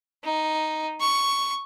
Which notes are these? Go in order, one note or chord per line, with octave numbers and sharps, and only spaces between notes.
D#4
C#6